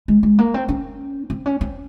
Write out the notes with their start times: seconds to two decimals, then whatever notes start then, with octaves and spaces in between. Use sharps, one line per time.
0.08 G#3
0.23 G#3
0.39 A#3
0.54 C4
0.69 C#4
1.30 C4
1.46 C#4
1.61 C4